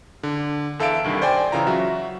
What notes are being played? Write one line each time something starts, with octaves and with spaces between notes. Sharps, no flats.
D3
E2 A4 E5 F5 D7
C2 G2 D#3
C5 D5 G5 G#5
C#3 E3 F4 A#5
F#3 F#4 E5